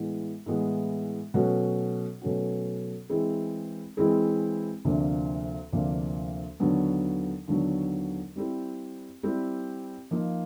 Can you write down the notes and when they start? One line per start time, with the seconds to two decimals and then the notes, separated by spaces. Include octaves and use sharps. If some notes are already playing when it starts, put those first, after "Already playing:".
Already playing: A2 E3 G#3 B3
0.46 A2 E3 G#3 B3
1.34 B2 F#3 A3 C#4 F#4
2.22 B2 F#3 A3 C#4 F#4
3.09 E3 G#3 C4 E4 G#4
3.97 E3 G#3 C4 E4 G#4
4.85 D2 C3 F3 A#3 D4
5.72 D2 C3 F3 A#3 D4
6.60 D#2 D3 F#3 B3
7.48 D#2 D3 F#3 B3
8.36 G3 C4 E4 G4
9.23 G3 C4 E4 G4
10.11 F3 A#3 D#4